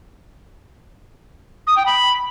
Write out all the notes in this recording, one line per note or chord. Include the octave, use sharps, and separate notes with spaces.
D#6
G5
B5